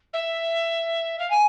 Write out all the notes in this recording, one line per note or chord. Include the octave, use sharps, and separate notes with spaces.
E5
F5
G#5